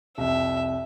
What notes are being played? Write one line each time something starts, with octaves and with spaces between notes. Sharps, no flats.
C2 F2 E5